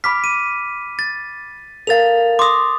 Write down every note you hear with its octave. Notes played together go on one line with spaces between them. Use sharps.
B5 D6 F6 B6
D#7
A6
A4 A#4 F5 A6 F7
C6 D6 D#6 A#6